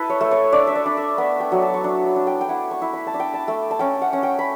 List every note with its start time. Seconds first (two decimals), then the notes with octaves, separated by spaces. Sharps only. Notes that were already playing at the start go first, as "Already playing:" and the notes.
Already playing: E4 A4 B4
0.10 C#5
0.21 A3
0.31 C#5
0.52 D4 D5
0.67 E5
0.75 D5
0.86 D4
0.97 E5
1.18 B3 B5
1.40 G5
1.52 F#3
1.62 A5
1.74 C#6
1.84 D4 B5
2.05 B5
2.16 D4
2.27 G5
2.41 G5
2.49 E4 F#5
2.71 C#6
2.82 E4
2.93 B5
3.07 A5
3.14 D4
3.20 G5
3.34 A5
3.48 A3
3.71 A5
3.79 C#4 G5
4.02 F#5
4.13 C#4
4.23 G5
4.39 B5